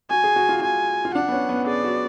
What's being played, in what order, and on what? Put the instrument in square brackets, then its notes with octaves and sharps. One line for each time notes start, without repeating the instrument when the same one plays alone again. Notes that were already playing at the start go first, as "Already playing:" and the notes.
[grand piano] F#4 [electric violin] G#5
[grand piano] G#4
F#4
F4
[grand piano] F4 [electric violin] G#5
[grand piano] F4
[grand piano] D4 [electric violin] F#5
[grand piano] B3
C#4
B3
[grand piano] G#4 [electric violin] D5
[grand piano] F#4